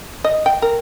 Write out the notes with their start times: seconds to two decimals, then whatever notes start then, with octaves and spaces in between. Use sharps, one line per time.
0.24 D#5
0.46 G5
0.62 A#4